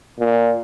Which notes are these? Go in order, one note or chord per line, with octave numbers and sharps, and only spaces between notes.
A#2